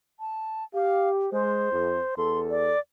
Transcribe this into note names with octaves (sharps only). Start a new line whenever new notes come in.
A5
G4 F5
G#3 C5
F2
E2 A4 C6
D5